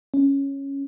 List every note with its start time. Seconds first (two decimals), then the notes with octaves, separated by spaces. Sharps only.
0.14 C#4